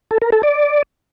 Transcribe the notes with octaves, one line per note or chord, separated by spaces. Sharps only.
A4
A#4
A4
D5